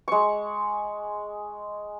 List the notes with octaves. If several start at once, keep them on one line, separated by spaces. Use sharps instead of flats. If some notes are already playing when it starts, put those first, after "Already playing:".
G#3 C#6